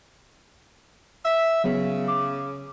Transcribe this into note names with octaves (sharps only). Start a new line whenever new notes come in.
E5 B6
C#3 F#3 B3
D6